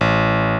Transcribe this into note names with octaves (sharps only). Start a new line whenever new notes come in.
A1